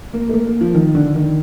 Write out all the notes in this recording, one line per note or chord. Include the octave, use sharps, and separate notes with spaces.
A#3
A3
A#3
A#3
F3
D#3
D3
D#3